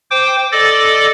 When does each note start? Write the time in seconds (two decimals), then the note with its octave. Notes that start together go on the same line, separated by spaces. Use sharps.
0.11 C5 G5 D6
0.52 A4 D5 D#5 D6 A6